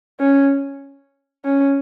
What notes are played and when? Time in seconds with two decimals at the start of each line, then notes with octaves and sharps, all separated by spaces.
0.20 C#4
1.45 C#4